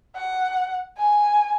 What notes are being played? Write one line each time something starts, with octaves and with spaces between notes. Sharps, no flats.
F#5
G#5